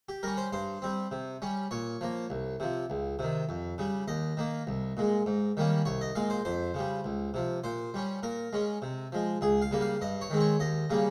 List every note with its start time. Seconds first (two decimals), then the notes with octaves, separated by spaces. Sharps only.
0.09 G4
0.23 G3 C#4 A#4
0.37 C5
0.52 G2 C5
0.82 G3 C4
1.11 C3
1.42 G3 C#4
1.71 A#2 C#5
2.01 F3 A#3
2.30 C2
2.60 C3 F3
2.90 C#2
3.19 C3 D#3
3.49 F2
3.78 C#3 G3
4.08 D#2 D#5
4.37 D#3 A#3
4.67 C2
4.97 A#2 G#3
5.26 G#2
5.57 D#3 G3 A#3 C#4
5.85 C2 C#5
6.01 D#5
6.15 A#2 G#3 F5
6.30 C5
6.45 F2 C5
6.74 C#3 G3
7.04 C#2
7.34 C3 F3
7.64 A#2 C5
7.94 G3 C#4
8.23 A#2 A#4
8.53 G#3 C#4
8.82 C3
9.12 F3 G#3
9.41 C#2 G#4
9.62 F5
9.71 C#3 G3 A#3
9.81 F5
10.01 G2 D#5
10.21 C#5
10.30 D#3 G#3 C4
10.41 C#5
10.60 D#2 D#5
10.90 C#3 G3 A#3 C#4